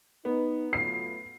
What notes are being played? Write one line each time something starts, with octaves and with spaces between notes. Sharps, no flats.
B3 D#4
F#3 A3 F4 C7